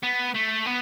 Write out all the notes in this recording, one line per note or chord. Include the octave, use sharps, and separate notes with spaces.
B3
A3
B3